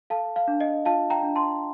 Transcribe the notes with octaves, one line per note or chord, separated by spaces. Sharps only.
A4 F5 A5
F5
D4
D#5
F4 F5 A5
G5 A#5
D4
A5 C6